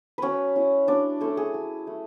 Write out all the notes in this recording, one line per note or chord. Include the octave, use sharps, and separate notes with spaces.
F#3 C#4 B4 C#5
C#4 E4
F#3 D4 D5
A3 C#4 E4 A4
G#4
F#3
A3 E4